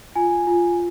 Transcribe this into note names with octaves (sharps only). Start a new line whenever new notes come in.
F4 G#5
F4